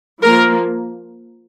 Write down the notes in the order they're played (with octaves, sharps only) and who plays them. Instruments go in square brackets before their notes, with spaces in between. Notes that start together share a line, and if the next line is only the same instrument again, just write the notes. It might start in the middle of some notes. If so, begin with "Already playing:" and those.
[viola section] F3 A#3 A#4